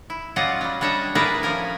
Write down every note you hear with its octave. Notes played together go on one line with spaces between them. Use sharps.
E4
F#3 C#4 F4 D5 D#5 F#5
F#3 G3
G3 D4 C#5 D#5 E5
E4 G#4 A#4 B4 D5
F3 C#4 A#4 G#5